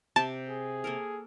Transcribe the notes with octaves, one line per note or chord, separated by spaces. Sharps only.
C3 G4 A5 D6
G#4
A#3 A4 A#4